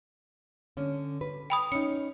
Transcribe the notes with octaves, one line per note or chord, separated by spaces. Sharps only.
D3 C#4
B4
G5 B5 D#6
C#4 D#4 C#7